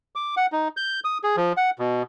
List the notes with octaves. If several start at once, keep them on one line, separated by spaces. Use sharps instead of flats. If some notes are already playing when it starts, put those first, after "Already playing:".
D6
F#5
D#4
G6
D#6
G#4
F3
F#5
B2